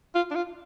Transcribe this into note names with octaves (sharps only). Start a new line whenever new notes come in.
F4
D4
F4